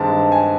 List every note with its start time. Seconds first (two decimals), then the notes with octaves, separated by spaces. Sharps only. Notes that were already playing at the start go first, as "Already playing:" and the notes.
Already playing: G2 D#3 G#3 C4 A5
0.32 G#5